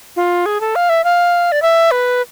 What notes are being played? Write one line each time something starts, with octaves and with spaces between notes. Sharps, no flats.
F4
G#4
A4
F5
E5
F5
D5
E5
B4